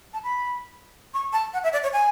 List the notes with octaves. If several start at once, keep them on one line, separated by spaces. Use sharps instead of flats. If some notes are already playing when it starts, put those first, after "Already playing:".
A5
B5
C#6
A5
F#5
E5
D5
C#5
G#5